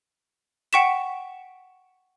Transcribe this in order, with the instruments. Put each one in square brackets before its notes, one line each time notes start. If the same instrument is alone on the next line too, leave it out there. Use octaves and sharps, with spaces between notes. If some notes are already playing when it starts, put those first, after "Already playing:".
[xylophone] F#5 G5 C#6 B6 E7